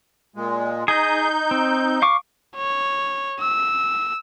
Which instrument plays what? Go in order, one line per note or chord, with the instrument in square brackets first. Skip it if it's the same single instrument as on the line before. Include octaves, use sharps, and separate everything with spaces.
[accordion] A#2 G#3
[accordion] D#4 G6 [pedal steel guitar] G#4 D#5
[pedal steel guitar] C4
F5 C#6 D6
[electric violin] C#5
E6